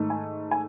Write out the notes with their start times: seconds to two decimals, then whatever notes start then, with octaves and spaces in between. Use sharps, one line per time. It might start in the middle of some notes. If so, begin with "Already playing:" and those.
Already playing: G#2 D#3 A3
0.10 G#5
0.51 G#5